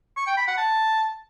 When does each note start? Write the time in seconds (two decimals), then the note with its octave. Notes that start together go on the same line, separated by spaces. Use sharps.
0.17 C#6
0.27 G5
0.37 B5
0.47 F#5
0.58 A5